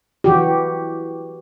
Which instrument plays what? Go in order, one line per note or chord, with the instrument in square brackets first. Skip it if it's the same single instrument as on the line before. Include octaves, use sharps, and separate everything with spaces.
[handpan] E3 F#4 G4